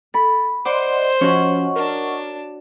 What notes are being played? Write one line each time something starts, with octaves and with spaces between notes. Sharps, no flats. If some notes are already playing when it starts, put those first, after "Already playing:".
A4 B5
C5 D5 D#5 F#5 C6 D6
F3 C#4 F#4 C#5 D#5 F#5 C#6
D4 A#4